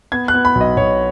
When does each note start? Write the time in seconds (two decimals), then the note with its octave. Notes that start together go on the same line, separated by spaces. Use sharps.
0.12 B3 G#6
0.28 F#6
0.34 B3
0.45 B5
0.55 B1
0.61 D#5
0.77 B1 C#5